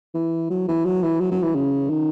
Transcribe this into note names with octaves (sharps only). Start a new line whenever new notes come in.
E3
F#3
E3
F#3
E3
F#3
F#3
E3
C#3
D#3